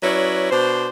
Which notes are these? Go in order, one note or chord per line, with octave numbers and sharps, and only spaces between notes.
F#3 C#4 E4 B4 D5
B2 D4 C5